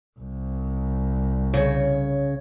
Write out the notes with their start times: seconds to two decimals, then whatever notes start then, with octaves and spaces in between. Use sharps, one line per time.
0.19 C2
1.53 C#3 C#5